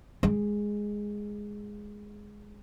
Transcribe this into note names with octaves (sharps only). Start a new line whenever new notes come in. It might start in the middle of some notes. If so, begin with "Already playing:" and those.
G#3